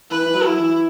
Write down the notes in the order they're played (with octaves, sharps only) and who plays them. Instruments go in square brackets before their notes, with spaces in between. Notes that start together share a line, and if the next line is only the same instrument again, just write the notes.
[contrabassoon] E3 [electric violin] B4
[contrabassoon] E3
F#3
[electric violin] E4
[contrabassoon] E3